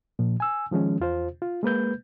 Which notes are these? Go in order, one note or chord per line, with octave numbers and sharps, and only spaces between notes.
A#2 F3
G#5 E6
D#3 F3 G#3 C#4
E2 F4 C5
F4
G#3 A#3 B4 G6